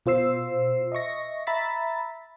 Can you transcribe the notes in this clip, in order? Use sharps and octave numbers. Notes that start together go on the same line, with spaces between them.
B2 F4 C5 E6 C7
D#5 E5 C#6 A#6
E5 A#5 B5 E6 A6 B6